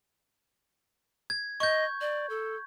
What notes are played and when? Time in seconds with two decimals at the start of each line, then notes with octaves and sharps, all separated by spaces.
1.30 G#6
1.60 D#5 C#6 G6
2.01 D5
2.29 A4